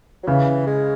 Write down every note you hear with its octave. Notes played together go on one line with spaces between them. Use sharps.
F#3
C#3 E3
G#3